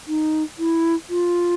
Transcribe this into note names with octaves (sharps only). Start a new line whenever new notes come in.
D#4
E4
F4